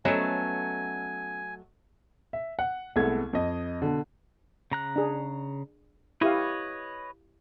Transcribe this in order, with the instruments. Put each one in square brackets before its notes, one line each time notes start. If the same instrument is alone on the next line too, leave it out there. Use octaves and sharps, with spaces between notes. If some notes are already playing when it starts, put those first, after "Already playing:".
[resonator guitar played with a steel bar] F#3 A3 [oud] B3 C#4 [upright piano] A4 C#5 D#5 [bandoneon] G#5
[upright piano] E5
F#5
C2 G#3 A3 B3 A4 G#6
F2 D#5
B2 D3
[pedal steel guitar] C#3 A#5 F#6
[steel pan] D4 G#4
[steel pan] E4 G4 F5 [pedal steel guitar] B4 C#5 D#5